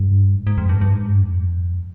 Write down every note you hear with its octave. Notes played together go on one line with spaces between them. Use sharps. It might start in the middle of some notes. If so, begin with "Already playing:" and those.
Already playing: G2
G#2
G#2
F2
G2
G2
G#2
G2
F2